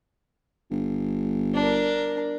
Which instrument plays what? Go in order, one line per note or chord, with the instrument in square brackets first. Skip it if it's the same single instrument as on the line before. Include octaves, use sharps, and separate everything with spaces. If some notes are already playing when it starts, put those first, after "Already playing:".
[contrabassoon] G1
[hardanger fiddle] D4 A#4